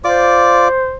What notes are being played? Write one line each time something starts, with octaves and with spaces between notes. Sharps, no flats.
F4 C5 D5 D6